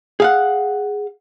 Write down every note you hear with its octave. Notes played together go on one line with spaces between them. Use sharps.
G#4 F5 F#5